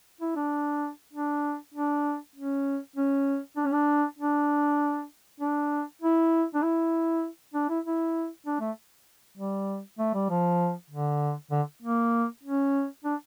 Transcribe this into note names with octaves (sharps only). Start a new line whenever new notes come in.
E4
D4
D4
D4
C#4
C#4
D4
C#4
D4
D4
D4
E4
D4
E4
D4
E4
E4
D4
A3
G3
A3
G3
F3
D3
D3
A#3
C#4
D4